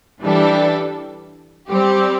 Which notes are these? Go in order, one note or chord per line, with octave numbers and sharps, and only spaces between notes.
E3 G3 D4 A4
G3 C4 G4